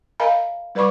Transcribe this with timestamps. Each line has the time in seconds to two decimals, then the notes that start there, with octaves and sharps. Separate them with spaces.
0.20 A#4 D#5 F5 G#5 A#5 B5
0.75 G3 B4 D5 B5 C#6 D6